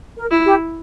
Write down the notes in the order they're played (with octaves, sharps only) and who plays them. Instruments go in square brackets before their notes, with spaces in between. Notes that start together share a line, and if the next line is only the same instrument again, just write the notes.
[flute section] A#4
[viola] E4
[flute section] G4